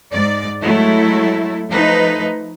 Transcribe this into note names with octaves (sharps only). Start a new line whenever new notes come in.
G#2 D5
F#3 G#3 A3 E4
F3 A3 D#4 B4